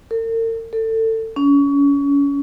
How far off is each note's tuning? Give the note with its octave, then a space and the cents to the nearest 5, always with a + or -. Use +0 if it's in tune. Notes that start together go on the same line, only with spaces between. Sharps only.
A#4 -45
A4 +25
C#4 +30